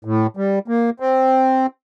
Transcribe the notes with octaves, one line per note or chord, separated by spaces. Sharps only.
A2
G3
A#3
C4